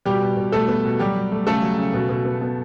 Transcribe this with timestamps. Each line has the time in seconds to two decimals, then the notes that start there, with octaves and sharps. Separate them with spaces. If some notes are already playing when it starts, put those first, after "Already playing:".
0.06 B2 G3 G4
0.22 B2
0.37 B2
0.52 B2 A3 A4
0.68 B3
0.85 B2
0.99 F#3 G3 G4
1.16 F#3
1.32 A3
1.47 C#3 A3 A4
1.62 F#3
1.78 C#3
1.94 B2
2.09 B2
2.25 B3
2.41 B3